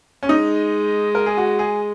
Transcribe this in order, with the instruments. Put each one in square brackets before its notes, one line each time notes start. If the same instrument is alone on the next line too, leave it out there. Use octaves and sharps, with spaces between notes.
[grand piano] C#4
[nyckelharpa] G#3 [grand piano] D#4
[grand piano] A#4
G#4
F#4
G#4